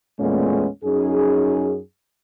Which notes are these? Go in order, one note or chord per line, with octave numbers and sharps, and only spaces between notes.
E2 A#2 G#3 A3 B3 C#4
F#2 C#4 D#4 G#4